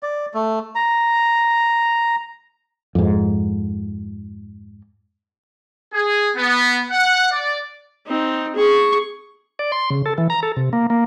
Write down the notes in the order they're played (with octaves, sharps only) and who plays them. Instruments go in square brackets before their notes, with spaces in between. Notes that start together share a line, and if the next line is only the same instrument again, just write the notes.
[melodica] D5
A3
A#5
[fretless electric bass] F2 G#2
[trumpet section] G#4
B3
F#5
D5
[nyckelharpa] C4 D#4
G#4 C#6
[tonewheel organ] D5
C6
C#3
A4
E3
A#5
A4
C3
A#3
A#3